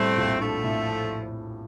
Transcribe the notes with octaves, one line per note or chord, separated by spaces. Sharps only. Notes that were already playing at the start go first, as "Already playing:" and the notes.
Already playing: A2 G3 A3 C4
A#1
F3 A3 D4
A2